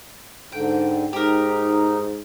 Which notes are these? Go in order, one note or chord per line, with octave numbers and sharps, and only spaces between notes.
G#2 D3 G5
G#2 D#4 G4 A#4